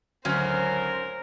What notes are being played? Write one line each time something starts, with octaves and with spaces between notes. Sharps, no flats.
G#1 D2 F#3 C#4 A#4 C5